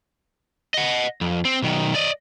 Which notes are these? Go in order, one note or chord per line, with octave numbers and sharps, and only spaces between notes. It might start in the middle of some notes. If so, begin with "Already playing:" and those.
D#5 F#5
F2
C4
B1 D#3
D5 D#5